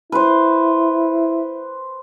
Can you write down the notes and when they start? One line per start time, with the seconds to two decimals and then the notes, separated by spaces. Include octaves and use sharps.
0.12 E4 B4 C5